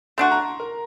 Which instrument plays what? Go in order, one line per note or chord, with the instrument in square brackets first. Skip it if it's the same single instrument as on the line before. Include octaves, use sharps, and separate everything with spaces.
[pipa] A3 D4 F#4 [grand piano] C6
[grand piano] A#5
A#4